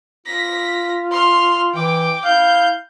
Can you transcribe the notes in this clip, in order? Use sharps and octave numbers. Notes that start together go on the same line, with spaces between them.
F4 A#6 B6
C6 F6
E3 G5 D6
E4 F5 G6